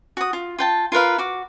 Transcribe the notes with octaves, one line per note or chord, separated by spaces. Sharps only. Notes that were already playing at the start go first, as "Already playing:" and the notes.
F#4 D#6
F4
F4 G5 A5
F4 A#4 B4 F5
F#4 D6